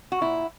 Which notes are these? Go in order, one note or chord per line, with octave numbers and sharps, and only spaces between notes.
F#4
A#2 E4